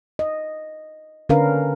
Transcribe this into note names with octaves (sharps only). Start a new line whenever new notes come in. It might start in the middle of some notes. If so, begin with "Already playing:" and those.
D#5
D3 C#4 D4 A#4 B4 F5